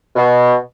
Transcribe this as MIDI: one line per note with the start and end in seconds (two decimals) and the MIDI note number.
0.16 0.55 47